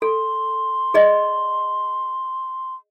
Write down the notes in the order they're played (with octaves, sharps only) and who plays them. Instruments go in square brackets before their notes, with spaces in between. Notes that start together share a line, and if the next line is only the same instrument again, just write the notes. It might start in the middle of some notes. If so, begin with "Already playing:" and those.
[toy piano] A4 [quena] C6
[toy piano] G#4 D5 D#5